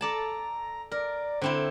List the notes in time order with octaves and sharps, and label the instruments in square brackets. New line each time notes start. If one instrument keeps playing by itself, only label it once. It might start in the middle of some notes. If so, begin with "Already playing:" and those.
[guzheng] A4 D5 A5 [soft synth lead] A#5
[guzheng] A#4 [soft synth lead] D5
[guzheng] D3 C4 E4 [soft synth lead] C5